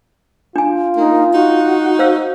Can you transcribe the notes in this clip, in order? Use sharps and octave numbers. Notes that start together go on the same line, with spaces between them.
D4 F4 G#5
A#3 D#4
D#4 F#4
C5 F5 E6